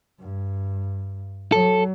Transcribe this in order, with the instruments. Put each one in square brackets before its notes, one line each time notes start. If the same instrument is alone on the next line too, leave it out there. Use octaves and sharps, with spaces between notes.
[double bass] G2
[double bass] F#3 [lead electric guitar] A4